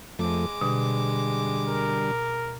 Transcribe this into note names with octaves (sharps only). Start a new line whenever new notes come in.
F2 G#3 A3 D6
B2 D3 G3
A#4